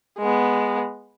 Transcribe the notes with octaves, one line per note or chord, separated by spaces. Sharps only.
G#3 B3